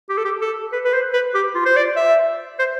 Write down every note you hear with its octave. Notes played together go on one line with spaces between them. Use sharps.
G4
A4
G4
A4
B4
B4
C5
B4
G4
F4
C5
D5
E5
C5